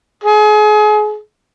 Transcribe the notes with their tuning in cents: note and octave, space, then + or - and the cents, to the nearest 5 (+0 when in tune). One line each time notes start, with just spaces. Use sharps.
G#4 +30